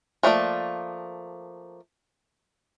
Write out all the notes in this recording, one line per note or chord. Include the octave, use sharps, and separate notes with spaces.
F3 A3 A#3 D5